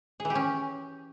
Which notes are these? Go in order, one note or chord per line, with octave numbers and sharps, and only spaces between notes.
G#4
E3
G4
C#4